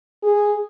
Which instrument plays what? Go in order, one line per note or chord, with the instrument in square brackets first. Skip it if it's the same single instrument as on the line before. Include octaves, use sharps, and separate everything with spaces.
[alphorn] G#4